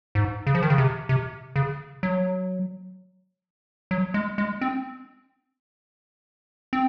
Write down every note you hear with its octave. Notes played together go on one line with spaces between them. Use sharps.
G#2
C#3
F3
D#3
C#3
C3
C3
C#3
F#3
F#3
G#3
G#3
C4
C4